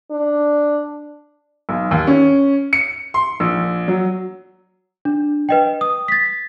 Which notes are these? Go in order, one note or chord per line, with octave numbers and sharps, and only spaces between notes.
D4
B1
D#2
C#4
C#7
C6
A#1
F#3
D4
B4 D#5 G5
D#6
A6 B6